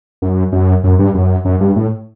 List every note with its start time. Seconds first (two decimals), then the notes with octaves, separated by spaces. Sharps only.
0.22 F#2
0.52 F#2
0.84 F#2
0.99 G2
1.15 F#2
1.45 F#2
1.60 G2
1.76 A2